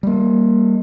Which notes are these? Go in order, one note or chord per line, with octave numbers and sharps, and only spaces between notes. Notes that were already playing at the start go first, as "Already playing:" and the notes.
G3 A#3